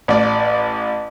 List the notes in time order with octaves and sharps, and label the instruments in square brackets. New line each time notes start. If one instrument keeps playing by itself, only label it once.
[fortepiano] A1 D5